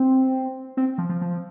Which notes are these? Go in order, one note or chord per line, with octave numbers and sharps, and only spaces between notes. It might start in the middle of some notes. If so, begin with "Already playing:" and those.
Already playing: C4
C4
F3
F3
F3